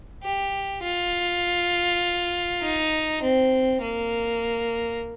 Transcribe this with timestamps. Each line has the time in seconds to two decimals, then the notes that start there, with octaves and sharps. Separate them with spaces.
0.23 G4
0.83 F4
2.63 D#4
3.22 C4
3.82 A#3